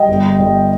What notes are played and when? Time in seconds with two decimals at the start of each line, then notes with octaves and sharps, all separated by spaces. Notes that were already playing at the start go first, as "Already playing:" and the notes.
Already playing: G3 D#5 G5
0.09 G1
0.39 G1